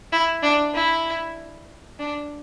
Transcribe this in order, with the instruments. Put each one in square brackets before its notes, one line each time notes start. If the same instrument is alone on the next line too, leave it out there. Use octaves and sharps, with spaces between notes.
[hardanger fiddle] E4
D4
E4
D4